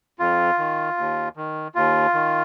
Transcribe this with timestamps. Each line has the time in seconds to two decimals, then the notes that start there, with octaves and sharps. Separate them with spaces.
0.19 F2 F4
0.59 D#3
0.98 D#2
1.37 D#3
1.75 D#2 F4
2.14 D#3